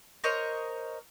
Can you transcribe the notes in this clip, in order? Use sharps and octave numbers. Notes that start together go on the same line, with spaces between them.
A#4 C5 C#5 D#5